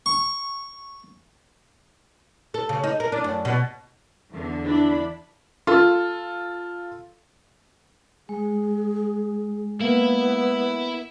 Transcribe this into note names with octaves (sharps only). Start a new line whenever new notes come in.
C#6
A4
C#3
D#4
A#4
D4
F#2
B2
E2 D3
D4 E4 B5
F4 A4
G#3 G#4
A#3 B3 E4